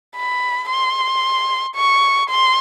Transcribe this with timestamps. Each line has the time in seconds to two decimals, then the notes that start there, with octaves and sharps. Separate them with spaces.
0.16 B5
0.70 C6
1.75 C#6
2.30 C6